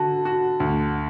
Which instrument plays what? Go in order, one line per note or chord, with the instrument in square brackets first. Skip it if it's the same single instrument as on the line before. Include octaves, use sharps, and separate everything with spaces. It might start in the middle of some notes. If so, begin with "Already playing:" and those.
Already playing: [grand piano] D3 F#4 [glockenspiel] A5
[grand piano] F#4
D2